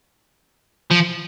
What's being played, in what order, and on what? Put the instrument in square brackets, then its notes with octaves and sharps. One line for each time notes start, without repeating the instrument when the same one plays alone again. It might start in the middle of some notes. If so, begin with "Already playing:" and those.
[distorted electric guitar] F3